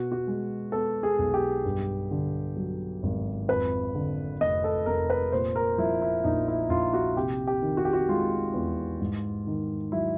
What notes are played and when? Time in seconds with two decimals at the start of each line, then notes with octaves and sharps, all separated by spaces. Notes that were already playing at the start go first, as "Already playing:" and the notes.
Already playing: B2 F#4
0.12 F#4
0.27 G#3
0.72 B3 A4
1.03 G#4
1.19 B1
1.34 G4
1.65 G2
2.11 D3
2.57 F#3
3.03 G#1
3.48 F2 B4
3.95 D3
4.41 F1 D#5
4.64 A4
4.86 F1 A#4
5.10 B4
5.32 A#2 C5
5.56 A#4
5.78 F3 E4
6.02 E4
6.24 A#1 D#4
6.48 E4
6.70 A#1 F4
6.93 F#4
7.16 C3 G4
7.47 G4
7.62 D#3
7.77 F#4
7.85 G4
7.93 F#4
8.08 G#3 F4
8.54 E2
9.01 G#2
9.47 D#3
9.92 F#3 E4